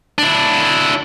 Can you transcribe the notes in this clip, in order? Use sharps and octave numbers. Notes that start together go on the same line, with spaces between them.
D4 E4